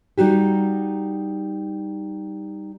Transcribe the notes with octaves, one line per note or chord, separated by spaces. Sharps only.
G3 D#4 F#4 G4